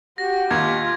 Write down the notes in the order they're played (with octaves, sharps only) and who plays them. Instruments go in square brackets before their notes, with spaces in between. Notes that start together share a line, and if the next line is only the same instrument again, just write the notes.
[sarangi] F#4 [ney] G4 [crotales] A#6
[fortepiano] D#2 [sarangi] F4 [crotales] G#6